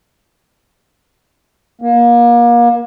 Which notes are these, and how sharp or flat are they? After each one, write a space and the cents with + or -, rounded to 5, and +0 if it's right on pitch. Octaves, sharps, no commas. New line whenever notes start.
A#3 +30